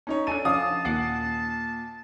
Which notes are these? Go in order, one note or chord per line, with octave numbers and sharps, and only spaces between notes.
C#4 D#4 C#5
D4 A4 G#5 D#7
F3 C#4 F5 A5 D6 D#6
D#2 A#2 F#5 D6 C7